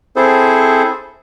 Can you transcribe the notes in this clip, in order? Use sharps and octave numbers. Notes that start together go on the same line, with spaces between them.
C4 E4 G#4 A4 C5